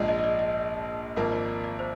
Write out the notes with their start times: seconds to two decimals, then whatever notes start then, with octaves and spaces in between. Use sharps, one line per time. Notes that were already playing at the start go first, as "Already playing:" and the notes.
Already playing: A#1 G#2 F3 G#3 D5
0.08 D#5
0.19 D#5
0.24 D5
0.39 D#5
1.16 G#1 G#2 F3 A#3
1.32 D5
1.48 D5
1.64 D5
1.79 C5